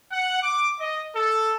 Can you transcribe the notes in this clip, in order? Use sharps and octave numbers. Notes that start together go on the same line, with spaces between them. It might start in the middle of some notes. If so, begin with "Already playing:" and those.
F#5
D6
D#5
A4